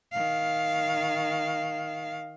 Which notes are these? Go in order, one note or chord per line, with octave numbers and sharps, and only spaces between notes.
D#3 F5